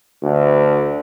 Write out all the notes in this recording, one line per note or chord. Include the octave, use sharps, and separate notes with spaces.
D2